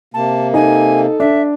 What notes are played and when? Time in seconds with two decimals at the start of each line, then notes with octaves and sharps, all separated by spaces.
0.14 C3 A#3 A5
0.54 D#4 A4 G#5
1.20 D4 E5